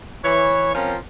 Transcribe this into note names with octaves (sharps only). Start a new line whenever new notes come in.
E3 C#5
F3 C4 C#4 F4 A#4